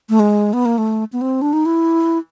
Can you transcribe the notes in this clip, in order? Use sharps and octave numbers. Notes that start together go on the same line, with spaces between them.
A3
G#3
B3
A#3
A3
B3
C4
D4
D#4
E4